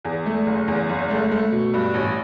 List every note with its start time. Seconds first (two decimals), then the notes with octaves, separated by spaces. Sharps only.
0.05 E2
0.26 A3
0.47 F#1
0.68 E2
0.89 F#1
1.10 A3
1.31 A3
1.52 B2
1.74 G2
1.94 A1